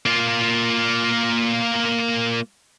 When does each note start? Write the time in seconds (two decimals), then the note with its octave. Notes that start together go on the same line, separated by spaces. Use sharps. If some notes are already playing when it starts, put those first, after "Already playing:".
0.06 A#3 F4